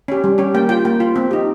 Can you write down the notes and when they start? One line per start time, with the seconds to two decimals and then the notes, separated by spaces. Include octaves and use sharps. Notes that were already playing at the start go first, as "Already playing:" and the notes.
0.08 C#4 G4
0.24 G3
0.38 C#4 G4
0.54 A#3 G5
0.69 F4 G5
0.85 A#3 G5
1.00 F4
1.16 C4
1.31 D#4 G4